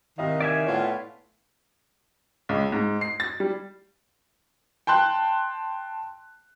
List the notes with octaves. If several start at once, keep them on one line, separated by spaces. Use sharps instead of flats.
C2 D#3 D#5 F5
D5 E5 G#5
A2 B3 F4 C#5
C#2
G#2
C7
A6
G3
G5 A5 C6 F#6